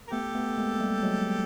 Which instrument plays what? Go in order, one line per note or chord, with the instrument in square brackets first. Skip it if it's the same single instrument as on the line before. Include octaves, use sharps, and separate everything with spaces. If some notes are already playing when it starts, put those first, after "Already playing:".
[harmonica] A#4
[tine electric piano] A3 B3 [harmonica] G4 A4
[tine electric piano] A3 B3
G#3 A#3
G3 A3
F#3 G#3